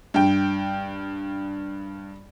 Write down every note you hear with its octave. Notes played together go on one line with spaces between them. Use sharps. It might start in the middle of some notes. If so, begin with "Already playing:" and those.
G2 G5